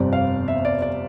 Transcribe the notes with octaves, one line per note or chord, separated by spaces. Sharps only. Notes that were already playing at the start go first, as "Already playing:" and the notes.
Already playing: G1 F2 C3 G3 C4 D5
F5
E5
D5
D5